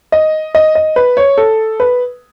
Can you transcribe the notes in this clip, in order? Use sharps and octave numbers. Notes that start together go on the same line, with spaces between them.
D#5
D#5
D#5
B4
C#5
A4
B4